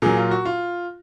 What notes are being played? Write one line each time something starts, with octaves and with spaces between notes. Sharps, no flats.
A#2 F#3 G#4
F4
F#4
F4